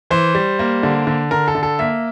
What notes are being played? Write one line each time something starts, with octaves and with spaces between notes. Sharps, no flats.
E3 C5
G3
A#3
D3
D3
D3 A#4
A4
D3
A4
A#3 E5